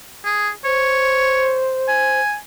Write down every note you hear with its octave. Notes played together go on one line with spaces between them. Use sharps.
G#4
C5 C#5
G#5